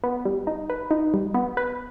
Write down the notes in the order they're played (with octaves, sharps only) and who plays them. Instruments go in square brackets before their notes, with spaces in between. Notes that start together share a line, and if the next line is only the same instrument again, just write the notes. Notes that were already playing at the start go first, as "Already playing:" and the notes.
[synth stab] B3
G3
D#4
B4
D#4
G3
B3
B4